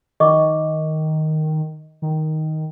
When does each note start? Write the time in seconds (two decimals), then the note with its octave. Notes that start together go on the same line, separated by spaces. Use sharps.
0.20 D#3 D#5 C#6 D6
2.02 D#3